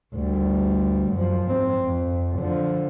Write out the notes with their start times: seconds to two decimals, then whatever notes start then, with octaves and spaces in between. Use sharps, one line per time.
0.14 D2 G3
1.11 F#2 F3
1.43 G#2 C4
1.84 F2
2.38 D3 F3